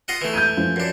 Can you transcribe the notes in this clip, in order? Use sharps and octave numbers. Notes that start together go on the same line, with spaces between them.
F4 D#5 F#5
E3 A3
G6 G#6 D#7
F3 C#4
F#2 D4